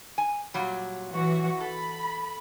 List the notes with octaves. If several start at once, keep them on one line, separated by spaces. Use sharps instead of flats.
G#5
A#2 F#3 G3
E3 F#4
A4 B5